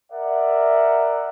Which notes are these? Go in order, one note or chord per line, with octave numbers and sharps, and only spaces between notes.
A#4 D5 E5 F#5